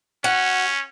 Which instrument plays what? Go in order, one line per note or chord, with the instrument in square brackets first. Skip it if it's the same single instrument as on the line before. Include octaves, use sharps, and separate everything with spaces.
[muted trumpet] C#4 [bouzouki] F#4